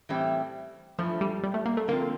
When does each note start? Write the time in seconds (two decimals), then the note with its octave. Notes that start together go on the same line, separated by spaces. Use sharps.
0.09 A2 E3 G3 C4 G4
0.98 G2 E3 F3 A3
1.21 G3
1.43 G3
1.54 A3
1.65 A#3
1.77 A3
1.88 D3 F3 A#3 C4 F4